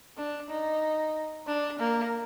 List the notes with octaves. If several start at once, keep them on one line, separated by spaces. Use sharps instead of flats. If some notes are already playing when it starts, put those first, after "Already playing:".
D4
D#4
D4
A#3